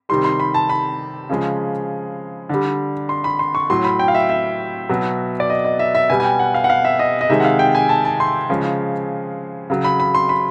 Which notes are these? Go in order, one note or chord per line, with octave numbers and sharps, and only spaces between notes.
C3 D#3 G3 C6
C6
B5
A5
B5
C#3 F3 G#3
D3 G3
C6
B5
C6
C#6
A2 F#3 C6
B5
G5
F5
E5
E5
B2 F#3
D5
D#5
D#5
E5
E5
B2 G3 G#5
G#5
G5
F#5
F5
F#5
F5
E5
D#5
D#5
C3 D#3 G#3 E5
F#5
F5
G5
G#5
A5
A5
C6
C#3 F3 G#3
C#3 F#3
B5
B5
C6
B5